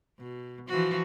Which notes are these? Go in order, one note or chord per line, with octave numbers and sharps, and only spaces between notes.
B2
E3 F3 F#4